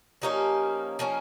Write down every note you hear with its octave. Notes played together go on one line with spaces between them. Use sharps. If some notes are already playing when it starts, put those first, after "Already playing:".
F3 A#3 C#4 D#4 G4
F3 A#3 C#4